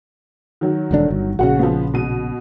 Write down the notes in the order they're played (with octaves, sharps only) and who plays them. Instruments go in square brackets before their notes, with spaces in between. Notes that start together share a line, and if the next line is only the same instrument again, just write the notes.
[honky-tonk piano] D#3 F#3
[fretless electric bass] E1 D3 D4
G1
[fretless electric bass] A#1 C#3 [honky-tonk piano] F#4 F#5
[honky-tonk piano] F3 B3
B2 D#7